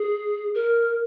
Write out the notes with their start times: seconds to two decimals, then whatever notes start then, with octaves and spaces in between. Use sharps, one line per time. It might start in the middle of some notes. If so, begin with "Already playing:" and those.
Already playing: G#4
0.55 A#4